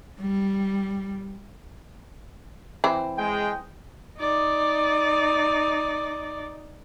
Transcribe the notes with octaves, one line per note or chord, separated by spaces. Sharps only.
G3
E3 C4
G#3 G5
D#4 D5